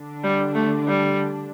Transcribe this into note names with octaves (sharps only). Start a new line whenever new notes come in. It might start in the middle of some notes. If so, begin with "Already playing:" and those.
Already playing: D3 D4
G3
A3
G3